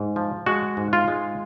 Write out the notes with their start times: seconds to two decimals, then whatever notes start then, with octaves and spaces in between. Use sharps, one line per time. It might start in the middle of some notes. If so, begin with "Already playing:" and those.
Already playing: G#2
0.16 F3
0.46 G#3 F#4
0.77 G#2
0.93 F4
1.08 G#3